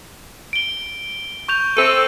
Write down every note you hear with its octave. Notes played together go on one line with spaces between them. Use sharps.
D7 G7
C#6 G6 F7
C4 A4 D#7